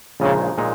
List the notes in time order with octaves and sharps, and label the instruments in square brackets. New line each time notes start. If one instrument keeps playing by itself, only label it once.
[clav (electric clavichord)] A#1 A#2 G#3 D#4 [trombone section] C#3
[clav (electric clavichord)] A#2 G#3 D#4